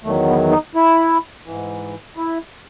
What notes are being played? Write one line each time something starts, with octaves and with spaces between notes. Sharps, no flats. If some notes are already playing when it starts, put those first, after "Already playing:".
E2 D#3 F#3 A3
B3
D#4
E4
G#2 E3
E4